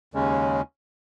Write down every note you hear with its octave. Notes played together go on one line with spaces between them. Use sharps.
D#2 C#3 G#3 C#4